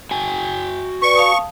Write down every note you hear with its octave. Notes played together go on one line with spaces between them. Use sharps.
F#4 G5 G#5
B4 D5 C#6
F5 A5 D#6